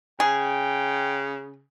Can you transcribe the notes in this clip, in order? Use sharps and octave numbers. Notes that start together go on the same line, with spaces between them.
C#3 G#4 G5